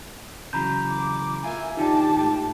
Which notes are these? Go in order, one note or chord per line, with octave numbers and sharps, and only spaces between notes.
C#3 E3 F#3 A#5 B5 G6
D6
A#3 F4 E5 G#5
D#2 D#3 D4 D#4 F4 G4 A5
G#2 A3